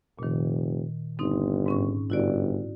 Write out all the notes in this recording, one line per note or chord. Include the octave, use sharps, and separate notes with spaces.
F1 A#2 D#3
G1 C4 D#4
G#2 C#4 C#6
G1 E4 F#4 D5